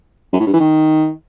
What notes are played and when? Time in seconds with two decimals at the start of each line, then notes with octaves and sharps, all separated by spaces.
0.33 F#2
0.40 A2
0.47 G2
0.53 E3
0.60 D#3